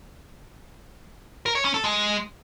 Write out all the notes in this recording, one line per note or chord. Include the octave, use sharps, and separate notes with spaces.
A#4
C#5
C#4
A4
G#3